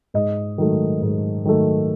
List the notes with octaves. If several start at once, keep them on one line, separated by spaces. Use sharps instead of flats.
G#2 D#5
D#3 F#3 A3
G#2
D#3 F#3 A3